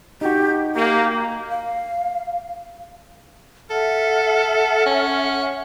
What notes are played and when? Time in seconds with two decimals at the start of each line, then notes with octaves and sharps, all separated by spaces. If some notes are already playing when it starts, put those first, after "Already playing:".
0.21 D#4 F#4 G4
0.75 A#3 G4
1.51 F5
3.70 A4 E5 F#5 F6
4.86 C#4